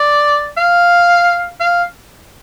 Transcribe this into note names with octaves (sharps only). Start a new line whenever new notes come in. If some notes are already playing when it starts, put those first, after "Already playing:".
Already playing: D5
F5
F5